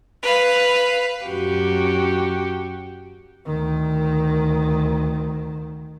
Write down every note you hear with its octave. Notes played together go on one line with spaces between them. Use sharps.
B4 F5
F#2 F#4 G4
D2 D#3